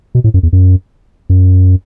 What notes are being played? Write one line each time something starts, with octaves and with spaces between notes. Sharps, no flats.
B2
A2
F#2
E2
F#2
F#2